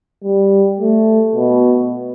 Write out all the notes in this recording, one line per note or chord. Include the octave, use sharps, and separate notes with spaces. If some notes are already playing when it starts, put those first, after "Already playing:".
G3
A3
B2